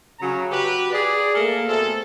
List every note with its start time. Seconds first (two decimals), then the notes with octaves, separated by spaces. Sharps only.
0.20 C#3 F#3 A#5
0.52 F#4 G4 B4
0.92 G#4 D5
1.34 A3 A#3 A4 A#4
1.68 B2 A3 C4 G#4 A4